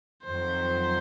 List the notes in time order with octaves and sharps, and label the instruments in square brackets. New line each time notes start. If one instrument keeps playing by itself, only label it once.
[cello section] F2 D#3 F#3 [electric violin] C5